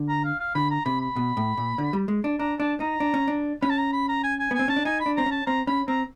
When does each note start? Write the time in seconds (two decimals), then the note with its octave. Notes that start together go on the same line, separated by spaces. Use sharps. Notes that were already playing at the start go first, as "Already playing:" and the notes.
Already playing: D3
0.09 A#5
0.24 F5
0.40 F5
0.55 D3 B5
0.71 A#5
0.85 C3 B5
1.01 B5
1.16 B2
1.37 A2
1.57 A#2
1.78 D3
1.93 G3
2.08 G#3
2.24 D4
2.39 D4 A#5
2.60 D4 A5
2.80 D#4 A#5
3.00 D4
3.14 C#4
3.28 D4
3.62 C#4 B5
3.70 A5
3.78 A#5
3.93 B5
4.08 A#5
4.23 G#5
4.39 G#5
4.51 B3
4.55 C4 G#5
4.68 C#4 A5
4.76 D4
4.85 D#4 G#5
5.00 B5
5.06 D4
5.17 C4 A#5
5.26 C#4
5.31 A5
5.47 C4 A#5
5.67 C#4 B5
5.88 C4 A#5